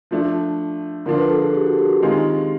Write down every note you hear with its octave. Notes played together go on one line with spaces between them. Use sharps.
F3 A3 D4
D3 F3 A#3 D4 F4 A#4
B4
A4
G#4
G4
F#4
G#4
G4
F#4
G4
D#3 G#3 C4 F4